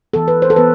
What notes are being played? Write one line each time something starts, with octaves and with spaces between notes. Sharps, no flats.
E3 B3 A4
B4
C5
A4
E3 B3 B4